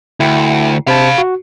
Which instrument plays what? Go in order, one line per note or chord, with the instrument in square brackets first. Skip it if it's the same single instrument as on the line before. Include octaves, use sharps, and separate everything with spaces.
[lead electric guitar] D2 [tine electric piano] E4 G5
[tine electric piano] C3 C5 A5 [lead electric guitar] F5 B5
[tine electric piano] F#4